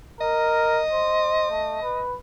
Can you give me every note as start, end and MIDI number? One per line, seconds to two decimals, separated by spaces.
0.21 0.83 70
0.21 2.01 75
0.92 1.47 72
1.50 1.82 57
1.82 2.17 71